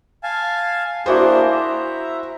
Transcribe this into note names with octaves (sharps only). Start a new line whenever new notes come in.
F5 G#5 A5
A#3 D4 E4 F#4 G#4 C5
E5 A#5